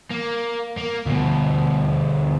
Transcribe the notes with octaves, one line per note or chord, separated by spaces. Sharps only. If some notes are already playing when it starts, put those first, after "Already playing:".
A#3
A#3
D2 B2